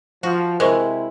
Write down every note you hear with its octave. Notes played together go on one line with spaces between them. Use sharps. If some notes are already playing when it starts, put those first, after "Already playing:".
F3 F#4
C3 G#3 E4 A#4 C5 C#6